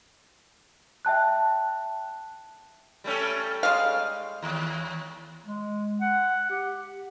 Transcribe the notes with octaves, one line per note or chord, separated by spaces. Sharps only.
E5 G5 A5 F#6
G3 A3 C#4
G#3 F5
D#2
G#3
F#5
G4